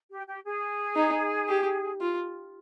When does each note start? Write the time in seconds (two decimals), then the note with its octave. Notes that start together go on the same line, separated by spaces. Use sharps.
0.10 G4
0.27 G4
0.44 G#4
0.96 D#4
1.49 G4
2.01 F4